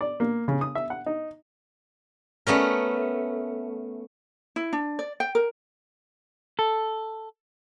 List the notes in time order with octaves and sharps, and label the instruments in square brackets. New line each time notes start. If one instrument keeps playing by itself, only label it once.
[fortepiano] D5
A#3
C#3
D#6
E5
F#5
D#4
[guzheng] A3 B3 C#4 A#4
[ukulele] E4
D4
D5
G5
A#4
[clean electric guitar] A4